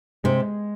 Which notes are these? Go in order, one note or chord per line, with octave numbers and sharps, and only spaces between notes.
C3 G#3